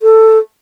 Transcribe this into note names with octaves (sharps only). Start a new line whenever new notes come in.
A4